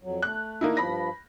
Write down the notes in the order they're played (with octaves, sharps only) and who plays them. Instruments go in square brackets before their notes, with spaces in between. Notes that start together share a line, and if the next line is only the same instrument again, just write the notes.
[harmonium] F2 F#3
[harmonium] A3 [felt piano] F#6
[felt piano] A#3 D#4 E4
[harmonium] G2 F3 [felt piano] B5 A#6